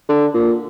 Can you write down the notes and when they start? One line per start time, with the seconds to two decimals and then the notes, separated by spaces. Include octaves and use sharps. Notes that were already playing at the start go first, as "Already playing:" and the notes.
0.09 D3
0.34 A#2